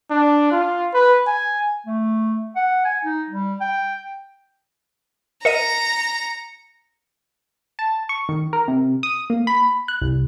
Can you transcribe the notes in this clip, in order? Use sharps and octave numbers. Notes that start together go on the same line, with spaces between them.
D4
F4
B4
G#5
A3
F#5
G#5
D#4
G3
G5
A#4 D#5 A#5 C#7 D#7
A5
C#6
D#3
A#4
C3
D#6
A#3
B5
F#6
C2